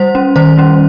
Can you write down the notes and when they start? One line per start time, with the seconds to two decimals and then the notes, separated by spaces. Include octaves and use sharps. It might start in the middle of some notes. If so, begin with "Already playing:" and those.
Already playing: G3 C5
0.15 C#4
0.36 D#3 C5
0.57 G3 C#4